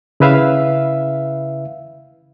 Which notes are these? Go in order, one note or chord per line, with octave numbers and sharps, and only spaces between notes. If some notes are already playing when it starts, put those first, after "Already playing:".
C#3 E4 B4 E5 F5